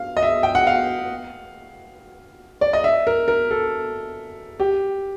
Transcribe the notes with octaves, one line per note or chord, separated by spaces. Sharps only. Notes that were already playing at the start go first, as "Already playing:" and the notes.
Already playing: F5
D#5
E5
G5
F#5
F5
D5
D#5
E5
A#4
A#4
A4
G4